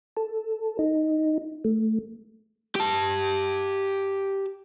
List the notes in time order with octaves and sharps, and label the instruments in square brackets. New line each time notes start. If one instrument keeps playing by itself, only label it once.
[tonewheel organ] A4
D#4
A3
[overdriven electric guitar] G4 A5